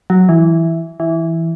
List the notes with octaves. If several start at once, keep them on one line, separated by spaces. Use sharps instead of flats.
F#3
E3
E3